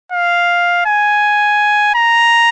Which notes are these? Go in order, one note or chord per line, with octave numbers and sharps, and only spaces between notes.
F5
G#5
A#5